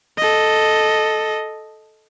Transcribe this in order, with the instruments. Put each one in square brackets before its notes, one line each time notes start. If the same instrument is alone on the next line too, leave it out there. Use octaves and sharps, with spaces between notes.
[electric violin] A4 D#5